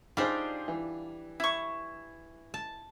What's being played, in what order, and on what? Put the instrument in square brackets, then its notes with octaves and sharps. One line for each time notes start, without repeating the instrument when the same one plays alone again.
[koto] G3 D4 [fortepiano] D#4 G#4 C5 [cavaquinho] F4
[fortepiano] E3
[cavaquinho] E4 C#6
[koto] A5